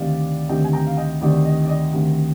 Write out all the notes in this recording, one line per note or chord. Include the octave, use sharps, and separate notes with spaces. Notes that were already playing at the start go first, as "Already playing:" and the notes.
Already playing: D2 C3 D#3 D5 F5
D2 C3 D#3 D#5 G5
G#5
G5 A#5
F5
D#5 G5
D2 C3 D#3 D5
D#5
D5
D#5
D2 C3 D#3